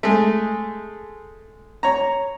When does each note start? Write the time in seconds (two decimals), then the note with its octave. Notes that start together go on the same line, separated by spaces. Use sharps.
0.03 G#3 A3
1.83 C#5 A#5